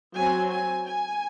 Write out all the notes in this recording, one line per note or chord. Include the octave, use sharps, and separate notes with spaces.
F#3 C4 G#5
G#5
G#5